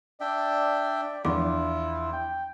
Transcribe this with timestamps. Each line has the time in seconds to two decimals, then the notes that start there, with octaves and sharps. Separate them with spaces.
0.21 D4 D5 E5 G5
1.25 E2 F3 D4 E4 F4 D6
2.13 G5